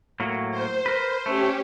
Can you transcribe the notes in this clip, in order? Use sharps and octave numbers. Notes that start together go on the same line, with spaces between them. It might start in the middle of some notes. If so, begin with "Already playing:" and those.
A2 F#3 A#3
C5
A#4 B4
A3 C#4 G4